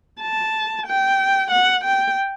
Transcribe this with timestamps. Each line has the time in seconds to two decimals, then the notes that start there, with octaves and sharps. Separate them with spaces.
0.21 A5
0.87 G5
1.51 F#5
1.84 G5